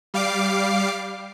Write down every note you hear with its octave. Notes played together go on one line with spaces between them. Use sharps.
G3 F5 D6 C7